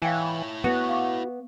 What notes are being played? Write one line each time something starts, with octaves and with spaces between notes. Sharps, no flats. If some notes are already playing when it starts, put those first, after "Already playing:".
E3 E4 C#5 F5 G5 G#5
B3 F#4
F5 C#6 D6